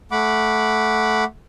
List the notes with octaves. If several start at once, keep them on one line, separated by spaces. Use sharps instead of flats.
A3 F#5 B5 D6